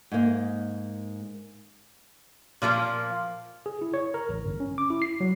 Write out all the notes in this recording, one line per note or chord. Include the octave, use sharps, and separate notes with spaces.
G#2 A#3
A#2 F3 A3 A#3
G#4
E4
C#5
A#4
A1
G1
C#4
D6
E4
C7
F#3